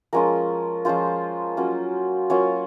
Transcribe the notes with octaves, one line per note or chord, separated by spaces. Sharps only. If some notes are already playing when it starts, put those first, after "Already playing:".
F3 G#3 C#4 F4 A#4
F3 G#3 C#4 F4 C5
F#3 A#3 C#4 F4
F#3 A#3 C#4 F4 C#5